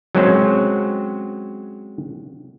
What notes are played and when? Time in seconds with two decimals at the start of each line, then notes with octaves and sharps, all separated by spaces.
0.15 F#3 G#3 C4 C#4 C5